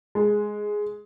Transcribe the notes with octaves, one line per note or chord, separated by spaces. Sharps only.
G#3